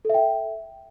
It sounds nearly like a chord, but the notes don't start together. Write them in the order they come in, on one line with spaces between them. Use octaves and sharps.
A4 E5 G5